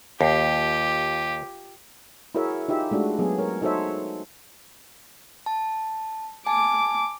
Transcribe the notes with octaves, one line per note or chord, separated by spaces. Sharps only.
D#2 F4 G4
E4 F#4 G#4 A#4 C#5 E5
D#4 F4 G4 E5
G#3 A3 D4 F#4
F#3 B3 G#4
A#4 C#5
D#4 F#4 A4 C5 C#5 E5
A5
G#5 A5 D6